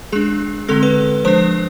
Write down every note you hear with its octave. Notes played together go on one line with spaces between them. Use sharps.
G#3 D4 G#4
D3 G#3 C4 A4
B4
F3 G#3 D4 C5